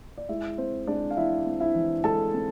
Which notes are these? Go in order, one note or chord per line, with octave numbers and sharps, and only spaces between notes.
D5
G#3 E4 E5
C4 C5
G#3 D4 D5
F5
E3 E4 E5
C4
E4 E5
E3
G#3 A4 A5
C4